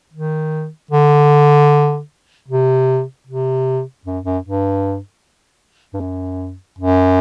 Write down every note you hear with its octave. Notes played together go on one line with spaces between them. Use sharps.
D#3
D3
C3
C3
F#2
F#2
G2
G2
F#2
F#2